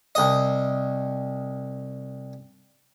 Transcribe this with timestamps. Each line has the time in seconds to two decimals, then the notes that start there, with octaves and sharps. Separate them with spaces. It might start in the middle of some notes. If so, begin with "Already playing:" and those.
0.15 C2 D#5